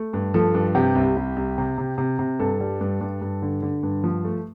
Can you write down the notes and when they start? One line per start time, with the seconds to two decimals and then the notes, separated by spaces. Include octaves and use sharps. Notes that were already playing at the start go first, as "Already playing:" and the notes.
Already playing: A3
0.13 G2
0.34 F3 A4
0.54 G2
0.75 C3 G4
0.95 C2
1.16 C2
1.36 C2
1.58 C3
1.78 C3
1.98 C3
2.19 C3
2.40 G2 A4
2.60 G3
2.81 G2
3.01 G2
3.21 G2
3.42 D3
3.62 D3
3.83 G2
4.04 F3
4.24 A3